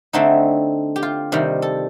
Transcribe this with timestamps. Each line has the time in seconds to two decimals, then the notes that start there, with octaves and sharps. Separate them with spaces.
0.13 D3 A3 C4 D#4
0.96 G4
1.03 F4
1.32 C3 D#3 G3
1.62 A4